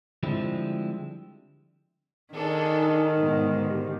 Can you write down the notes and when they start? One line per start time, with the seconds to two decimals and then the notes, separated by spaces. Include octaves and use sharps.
0.23 D3 F3 G3 G#3 C4 E4
2.34 D#3 D4 D#4 G#4 A4
3.18 G#2 B2 D3
3.68 G4